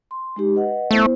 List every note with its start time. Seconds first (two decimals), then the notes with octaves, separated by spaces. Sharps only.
0.11 C6
0.36 G#3 D#4 G4
0.55 B4 D#5 F#5
0.91 A3 B3 E4 C5